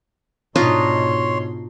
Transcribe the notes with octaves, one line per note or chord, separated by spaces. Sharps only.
G#2 B2 D4 D#4 F4 C#5 C6